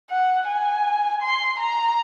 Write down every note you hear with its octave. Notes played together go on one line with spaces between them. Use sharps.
F#5
G#5
C6
A#5